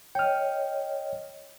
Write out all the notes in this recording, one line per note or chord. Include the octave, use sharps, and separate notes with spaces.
C#5 D#5 G5 F6